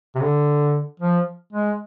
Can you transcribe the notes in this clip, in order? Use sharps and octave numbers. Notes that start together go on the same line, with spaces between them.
C3
D3
F3
G#3